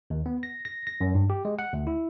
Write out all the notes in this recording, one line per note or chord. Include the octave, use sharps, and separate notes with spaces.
D#2
B3
A#6
A#6
A#6
F#2
G2
G4
G#3
F#5
D2
E4